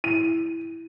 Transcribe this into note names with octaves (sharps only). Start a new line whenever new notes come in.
E4 D#7